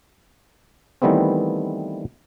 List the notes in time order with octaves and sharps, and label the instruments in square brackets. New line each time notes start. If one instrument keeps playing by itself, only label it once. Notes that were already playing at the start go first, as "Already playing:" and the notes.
[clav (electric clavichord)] D#3 E3 G3 A3 B3 C4